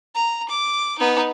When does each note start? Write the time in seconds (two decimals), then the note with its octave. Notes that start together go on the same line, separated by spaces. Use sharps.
0.15 A#5
0.49 D6
0.99 B3 D#4